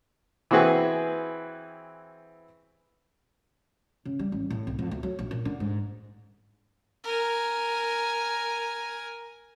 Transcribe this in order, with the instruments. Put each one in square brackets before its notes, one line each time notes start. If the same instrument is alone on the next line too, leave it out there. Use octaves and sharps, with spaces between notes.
[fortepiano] E3 C4 F#4 G#4 B4
[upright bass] C#3
G3
A1
A2
C2
F2
D2
F#3
A#1
A#2
D3
G#2
[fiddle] A#4 G#5